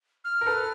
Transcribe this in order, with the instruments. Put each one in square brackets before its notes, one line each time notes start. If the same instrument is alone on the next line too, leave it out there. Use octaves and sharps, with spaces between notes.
[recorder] F6
[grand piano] A#4
A4 B4